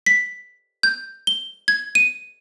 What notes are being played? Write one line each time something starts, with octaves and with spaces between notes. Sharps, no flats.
B6
G6
G7
G#6
D#7